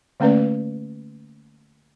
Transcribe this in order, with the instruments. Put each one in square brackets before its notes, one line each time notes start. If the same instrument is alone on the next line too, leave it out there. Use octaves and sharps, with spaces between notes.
[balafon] D3 A3 A#3 C#4 B4 D5